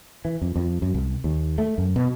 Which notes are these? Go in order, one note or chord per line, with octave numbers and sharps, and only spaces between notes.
E3
F2
F2
F#2
C2
D#2
A3
F#2
B2